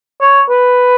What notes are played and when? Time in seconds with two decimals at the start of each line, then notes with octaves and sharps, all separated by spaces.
0.21 C#5
0.49 B4